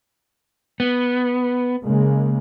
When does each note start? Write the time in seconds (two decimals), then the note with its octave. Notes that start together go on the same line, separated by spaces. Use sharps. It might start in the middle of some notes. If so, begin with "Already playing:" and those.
0.80 B3
1.82 C#3 G#3 A#3